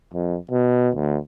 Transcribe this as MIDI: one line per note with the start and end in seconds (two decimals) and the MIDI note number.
0.14 0.36 41
0.51 0.89 47
0.95 1.17 38